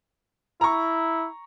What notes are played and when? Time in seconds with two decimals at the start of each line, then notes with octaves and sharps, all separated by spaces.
0.61 E4 A#5 C#6